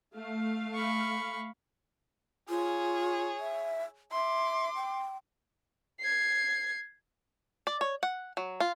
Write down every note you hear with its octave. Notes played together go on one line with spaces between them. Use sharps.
A3 F5
B5 C#6
F4 G#4 C#5
E5
E5 C6 D6
G5
G#6 C7
D5
C#5
F#5
F#3
F4